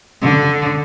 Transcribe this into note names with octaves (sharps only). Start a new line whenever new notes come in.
D3